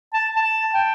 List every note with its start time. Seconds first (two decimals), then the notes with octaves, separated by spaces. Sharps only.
0.14 A5
0.36 A5
0.74 G5